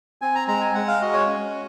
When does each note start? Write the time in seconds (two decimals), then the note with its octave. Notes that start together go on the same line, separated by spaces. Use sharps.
0.22 C4 G#5
0.35 A#5
0.48 G#3 A#5
0.61 G#5
0.75 G#3 F#5
0.88 F5
1.01 F#4 D#5
1.14 C#5
1.27 C#4